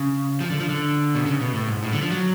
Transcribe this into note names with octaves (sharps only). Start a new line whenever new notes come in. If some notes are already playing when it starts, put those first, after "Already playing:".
Already playing: C#3
F3
D3
F3
D3
B2
C#3
B2
A2
G#2
A2
D3
F3
F#3